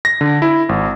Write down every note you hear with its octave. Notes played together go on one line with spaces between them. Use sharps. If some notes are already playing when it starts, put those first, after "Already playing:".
A#6
D3
E4
G#1